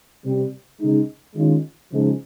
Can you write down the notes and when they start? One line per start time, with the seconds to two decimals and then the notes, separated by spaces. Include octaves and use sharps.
0.24 C3 G3 C4
0.80 C#3 G#3 D#4
1.35 D#3 G#3 C#4 F4
1.90 C#3 F3 G#3 D#4